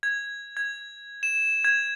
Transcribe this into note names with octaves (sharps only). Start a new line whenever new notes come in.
G#6
G#6
E7
G#6